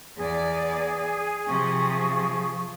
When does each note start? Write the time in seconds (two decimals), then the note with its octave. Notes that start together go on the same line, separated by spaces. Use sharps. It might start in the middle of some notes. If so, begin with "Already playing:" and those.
0.17 E2 G#4 D5
1.48 C3 F3 C#6